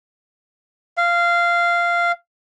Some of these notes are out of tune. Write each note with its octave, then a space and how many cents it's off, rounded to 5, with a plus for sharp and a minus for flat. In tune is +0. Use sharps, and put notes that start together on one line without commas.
F5 -15